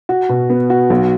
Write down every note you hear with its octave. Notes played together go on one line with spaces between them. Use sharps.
F#4
B2
B3
F#4
B1